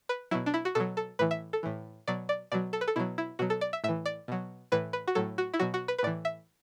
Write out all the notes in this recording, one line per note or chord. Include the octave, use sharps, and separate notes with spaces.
B4
B2 F#3 E4
D4
E4
F#4
B2 F#3 A4
A4
A2 E3 B4
E5
A4
A2 E3
B2 F#3 D5
D5
B2 F#3 D5
A4
B4
A4
B2 F#3 E4
E4
B2 F#3 F#4
A4
D5
E5
A2 E3 E5
D5
B2 F#3
A2 E3 B4
B4
F#4
A2 F#3 A4
F#4
E4
B2 F#3 F#4
F#4
B4
B4
A2 E3 D5
E5